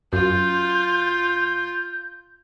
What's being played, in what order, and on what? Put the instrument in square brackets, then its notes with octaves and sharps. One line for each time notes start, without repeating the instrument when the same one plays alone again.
[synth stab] F#2 [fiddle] F4 [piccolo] G6